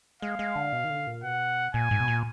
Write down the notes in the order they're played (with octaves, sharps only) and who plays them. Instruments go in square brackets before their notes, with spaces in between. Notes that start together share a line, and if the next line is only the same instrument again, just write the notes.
[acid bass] G#3 [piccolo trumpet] F5
[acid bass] G#3
D3
B2
D#3
D3
A#2
[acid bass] B2 [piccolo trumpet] F#5
[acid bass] A#2 [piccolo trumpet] G#5
[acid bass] G#2
B2
A#2